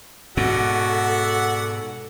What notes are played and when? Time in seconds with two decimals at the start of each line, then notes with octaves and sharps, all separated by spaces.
0.37 G#2 B2 F#4 A4 D5 E5 F#5